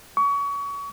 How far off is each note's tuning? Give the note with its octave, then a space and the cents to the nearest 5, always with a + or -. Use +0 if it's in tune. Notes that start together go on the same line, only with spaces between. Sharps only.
C#6 +30